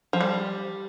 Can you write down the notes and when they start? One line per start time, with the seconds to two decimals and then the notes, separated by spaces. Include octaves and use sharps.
0.13 F3
0.21 G3